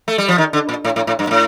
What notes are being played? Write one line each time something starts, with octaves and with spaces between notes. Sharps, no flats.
A3
G3
F3
D#3
D3
A#2
A2
A2
A2
G2
A#2
A2